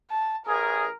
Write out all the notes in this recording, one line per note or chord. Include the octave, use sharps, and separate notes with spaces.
A5
A1 G#4 A#4